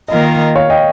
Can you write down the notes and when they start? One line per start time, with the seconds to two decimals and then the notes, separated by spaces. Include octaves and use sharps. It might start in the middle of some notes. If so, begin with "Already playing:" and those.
0.08 D#3 A#3 F4 A#4 D#5
0.55 C#5 F5
0.70 D#5 G5